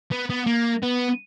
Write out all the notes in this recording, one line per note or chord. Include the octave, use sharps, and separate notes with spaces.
B3
B3
A#3
B3